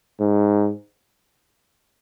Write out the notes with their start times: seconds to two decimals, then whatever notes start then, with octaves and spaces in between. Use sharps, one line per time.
0.20 G#2